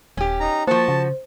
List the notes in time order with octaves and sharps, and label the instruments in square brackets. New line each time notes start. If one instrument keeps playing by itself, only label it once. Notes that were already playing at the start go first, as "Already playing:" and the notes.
[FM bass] D#1 [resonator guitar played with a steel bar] C#4 G4
[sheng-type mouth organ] D#4 A#5
[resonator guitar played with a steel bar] F3 F#4 [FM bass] A#3 [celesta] C5 [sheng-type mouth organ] A5
[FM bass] C#3